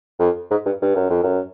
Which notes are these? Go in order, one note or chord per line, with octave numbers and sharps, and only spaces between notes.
F2
G#2
G2
G2
F#2
F2
F#2